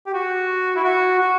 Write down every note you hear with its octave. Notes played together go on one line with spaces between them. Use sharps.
G4
F#4
E4
F#4
F#4